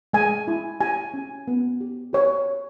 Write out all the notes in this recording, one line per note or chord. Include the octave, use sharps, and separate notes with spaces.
G#3 G#5
E4
G4 G#5
C#4
B3
G4
G4 C#5